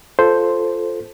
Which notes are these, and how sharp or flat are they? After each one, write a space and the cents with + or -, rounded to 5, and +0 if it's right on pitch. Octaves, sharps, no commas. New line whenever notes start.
F4 +0 A4 +0 C5 +0